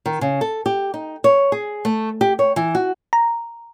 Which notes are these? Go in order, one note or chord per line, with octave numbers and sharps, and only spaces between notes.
D#3
C#3
A4
G4
D#4
C#5
G#4
A3
G4
C#5
E3
F#4
A#5